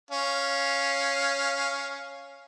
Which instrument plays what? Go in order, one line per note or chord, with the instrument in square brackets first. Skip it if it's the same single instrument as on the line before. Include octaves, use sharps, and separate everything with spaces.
[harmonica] C#4 F5